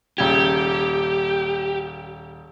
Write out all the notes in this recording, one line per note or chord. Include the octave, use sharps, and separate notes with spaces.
D#1 C#3 G4 G#6